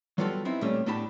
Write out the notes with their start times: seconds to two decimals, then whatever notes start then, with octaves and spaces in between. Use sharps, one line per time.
0.18 F#3 G3 B3 F4 F#4 A4
0.45 B3 C4 D#4 E4
0.61 A#2 G3 A3 C#4
0.86 A2 B3 D4 G4 A5 B5